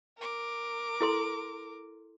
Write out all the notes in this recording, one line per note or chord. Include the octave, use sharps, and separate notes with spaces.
A#4 D6
E4 A4 C6